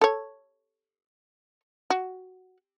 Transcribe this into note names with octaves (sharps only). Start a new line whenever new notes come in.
A4 C#5
F#4